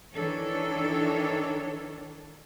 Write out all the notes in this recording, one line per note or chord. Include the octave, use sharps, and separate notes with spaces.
D#3 E3 D4 A4 C#5